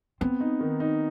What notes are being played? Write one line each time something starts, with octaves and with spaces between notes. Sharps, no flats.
B3 C4
D#4
D#3
D#4